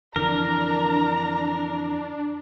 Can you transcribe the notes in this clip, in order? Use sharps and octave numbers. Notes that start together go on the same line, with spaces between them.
F2 D3 E3 D4 A#4 A#5